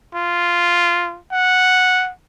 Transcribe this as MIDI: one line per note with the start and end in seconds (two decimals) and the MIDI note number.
0.15 1.19 65
1.32 2.11 78